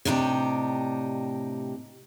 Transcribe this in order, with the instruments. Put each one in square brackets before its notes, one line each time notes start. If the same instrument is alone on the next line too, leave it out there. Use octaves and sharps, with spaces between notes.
[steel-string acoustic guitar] A2 C3 D4 D#4 G4